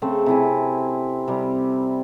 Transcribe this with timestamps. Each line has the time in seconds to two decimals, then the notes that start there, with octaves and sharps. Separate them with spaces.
0.02 C#3 A3 C4
0.26 C3 E4 G#5
1.28 C3 G3